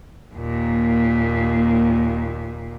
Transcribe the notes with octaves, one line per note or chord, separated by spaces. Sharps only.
D#2 A#2